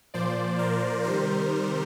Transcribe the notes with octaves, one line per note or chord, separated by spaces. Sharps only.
A#2 F3 C5 D5
A#4 C5
C3 D#3 G3 A#4 C5